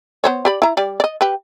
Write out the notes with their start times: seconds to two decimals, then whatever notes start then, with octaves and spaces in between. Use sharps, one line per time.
0.24 B3 C5 C#5
0.45 G4 D5 B5
0.62 E4 A#5
0.77 G3 D5
1.00 D5 D#5
1.21 G4 B4